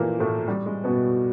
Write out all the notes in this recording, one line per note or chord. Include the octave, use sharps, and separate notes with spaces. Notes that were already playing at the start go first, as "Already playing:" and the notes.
Already playing: A#2 E3 F3 A3 A#3 E4 F4
A2 A3
G3
G#3
B2 B3